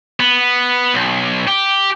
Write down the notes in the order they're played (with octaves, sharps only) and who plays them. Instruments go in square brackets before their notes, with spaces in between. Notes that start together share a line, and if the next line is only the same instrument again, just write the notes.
[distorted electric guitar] B3
B1
G4